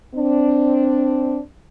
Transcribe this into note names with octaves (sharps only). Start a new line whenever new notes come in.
C4 D4